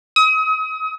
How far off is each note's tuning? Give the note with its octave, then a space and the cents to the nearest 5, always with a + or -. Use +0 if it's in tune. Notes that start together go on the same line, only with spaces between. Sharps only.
D#6 +35